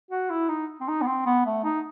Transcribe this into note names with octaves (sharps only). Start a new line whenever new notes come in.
F#4
E4
D#4
C4
D#4
B3
C4
B3
A3
D#4